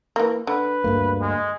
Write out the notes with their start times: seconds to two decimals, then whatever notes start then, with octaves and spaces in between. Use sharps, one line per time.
0.16 E3 A#3
0.47 D3 B4
0.84 D2 G2 A#3
1.21 G#3